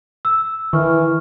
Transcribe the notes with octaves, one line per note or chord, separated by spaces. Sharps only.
E6
D#3 E3 C#6 F6